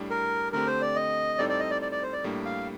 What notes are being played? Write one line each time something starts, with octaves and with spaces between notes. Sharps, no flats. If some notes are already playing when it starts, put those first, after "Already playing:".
Already playing: A2 G3 D4
A#4
D3 A3 C4 G4 A#4
C5
D5
D#5
A2 G3 C4 D#4 A4 D5
D5
D#5
D5
D5
D5
C5
D5
A2 G3 A#3 D4
F5